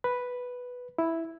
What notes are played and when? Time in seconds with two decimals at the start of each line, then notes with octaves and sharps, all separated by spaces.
0.04 B4
0.98 E4